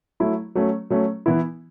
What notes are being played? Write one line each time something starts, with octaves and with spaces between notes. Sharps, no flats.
F#3 A3 E4
F#3 A3 C#4
F#3 A3 C#4
E3 B3 E4